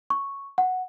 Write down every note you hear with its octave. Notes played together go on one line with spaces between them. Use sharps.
C#6
F#5